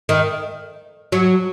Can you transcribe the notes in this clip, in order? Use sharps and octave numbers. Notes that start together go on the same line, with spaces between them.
D#3
F#3